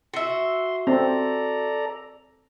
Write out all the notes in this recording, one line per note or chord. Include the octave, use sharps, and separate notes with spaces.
F#4 E5 C6
C4 A4 D5 A#5